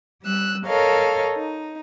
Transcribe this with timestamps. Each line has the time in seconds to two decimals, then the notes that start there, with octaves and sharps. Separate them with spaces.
0.23 G3 E6 F#6
0.67 A4 A#4 C#5 D#5 F5
1.35 D#4